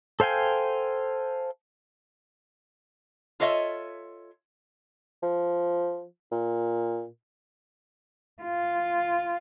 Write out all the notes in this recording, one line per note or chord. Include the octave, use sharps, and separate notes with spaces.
A4 C5 F5 G5 G#5
F4 A4 C#5 D#5 E5
F3
A#2
F4